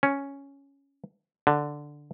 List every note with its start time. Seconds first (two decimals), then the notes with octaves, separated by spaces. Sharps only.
0.03 C#4
1.47 D3